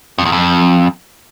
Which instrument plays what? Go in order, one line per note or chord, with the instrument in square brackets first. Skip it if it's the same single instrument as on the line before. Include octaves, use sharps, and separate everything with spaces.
[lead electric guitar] F2
E2
F2